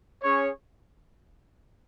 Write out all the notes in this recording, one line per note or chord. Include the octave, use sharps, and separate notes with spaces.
C#4 G#4 C#5